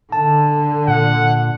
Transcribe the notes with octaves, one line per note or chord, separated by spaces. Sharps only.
D3 A5
A#2 F#5